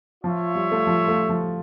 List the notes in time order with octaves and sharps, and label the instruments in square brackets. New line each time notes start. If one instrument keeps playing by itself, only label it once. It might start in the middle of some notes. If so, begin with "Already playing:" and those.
[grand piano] F3 [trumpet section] F4 C#5 E5
[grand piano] G3
A3
F3
A3
F3